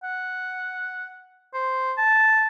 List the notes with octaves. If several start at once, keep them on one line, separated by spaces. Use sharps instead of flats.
F#5
C5
A5